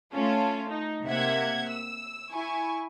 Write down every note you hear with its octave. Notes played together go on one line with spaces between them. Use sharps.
A3 C#4 F4 A4
D#4
C3 A#3 E5 F#5 G#6
E6
E4 G#5 C#6